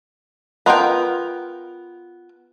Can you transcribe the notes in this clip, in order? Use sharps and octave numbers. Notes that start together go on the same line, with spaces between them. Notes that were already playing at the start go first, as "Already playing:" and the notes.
B3 F4 A#4 G5